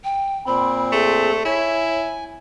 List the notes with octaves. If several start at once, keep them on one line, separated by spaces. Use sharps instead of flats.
G5
A#2 C4 B5
A3 G#4
E4 C#5 G#5